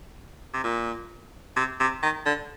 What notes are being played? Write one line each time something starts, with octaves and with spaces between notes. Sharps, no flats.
C3
A#2
C3
C3
D#3
D3